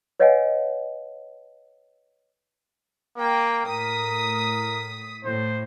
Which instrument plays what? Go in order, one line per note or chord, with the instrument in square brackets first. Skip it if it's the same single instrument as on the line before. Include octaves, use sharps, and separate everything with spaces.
[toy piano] B4 C#5 D#5 F5 F#5 G#5
[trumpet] A#3 [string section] G5
[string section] A2 D#6 B6 [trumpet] A#4
[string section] A2 [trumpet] C5